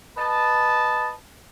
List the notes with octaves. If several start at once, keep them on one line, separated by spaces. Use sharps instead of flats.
B4 D#5 A5